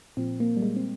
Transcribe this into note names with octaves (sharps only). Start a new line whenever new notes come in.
A#2 F3 C4
A#3
G3
G#3
C4